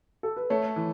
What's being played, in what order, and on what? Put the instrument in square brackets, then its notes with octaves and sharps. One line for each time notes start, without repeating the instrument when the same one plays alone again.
[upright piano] A4
B4
[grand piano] A3 [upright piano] C#5
[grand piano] E3